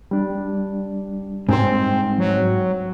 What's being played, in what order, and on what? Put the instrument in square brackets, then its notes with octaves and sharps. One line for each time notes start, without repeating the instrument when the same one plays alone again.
[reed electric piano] G3 D4
[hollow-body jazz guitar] G#2 C5 [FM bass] C4
[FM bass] F#3